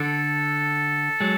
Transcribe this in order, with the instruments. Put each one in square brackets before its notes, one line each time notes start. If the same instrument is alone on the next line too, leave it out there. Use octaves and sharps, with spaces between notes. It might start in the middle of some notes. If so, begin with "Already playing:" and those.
Already playing: [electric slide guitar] D3 [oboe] A4
[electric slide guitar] F#3 G#3